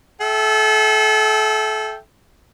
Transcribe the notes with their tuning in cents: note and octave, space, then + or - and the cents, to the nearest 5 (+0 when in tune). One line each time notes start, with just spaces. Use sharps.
A4 -30 E5 +0 G5 +0